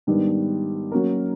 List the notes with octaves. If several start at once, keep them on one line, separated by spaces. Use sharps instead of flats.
G#2 D#3 G3 B3 D4
F#3 A#3 C#4 F#4 A#4